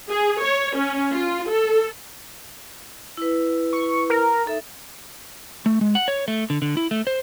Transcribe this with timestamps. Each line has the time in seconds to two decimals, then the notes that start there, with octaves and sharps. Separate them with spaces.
0.11 G#4
0.43 C#5
0.78 C#4
1.14 F4
1.50 A4
3.17 E4 B4
3.73 C#6
4.10 A#4
4.46 D#4 A4 E5
5.66 A3
5.81 G#3
5.95 F#5
6.08 C#5
6.28 A3
6.50 D3
6.62 D3
6.77 E4
6.91 A3
7.07 C5